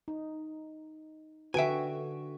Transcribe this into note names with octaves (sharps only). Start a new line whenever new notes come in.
D#4
D3 F#4 B4 E5 G5 G#5